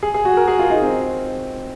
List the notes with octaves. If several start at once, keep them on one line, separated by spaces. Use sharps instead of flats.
G#4
G#4
F#4
A#4
G#4
F4
D#4
C4